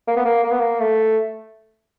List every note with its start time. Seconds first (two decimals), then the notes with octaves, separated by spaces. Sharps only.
0.07 A#3
0.16 B3
0.25 A#3
0.44 A#3
0.51 B3
0.60 A#3
0.80 A3